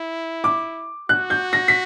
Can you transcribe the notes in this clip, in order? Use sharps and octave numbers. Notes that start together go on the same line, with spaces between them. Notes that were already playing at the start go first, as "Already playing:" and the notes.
Already playing: E4
D6
F#4 F#6
G6
A#6
B6